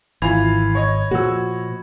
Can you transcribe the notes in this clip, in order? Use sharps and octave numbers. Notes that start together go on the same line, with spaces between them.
G#1 E3 F4 B5 G#6
C#5 D#5
A#2 F3 F#4 E6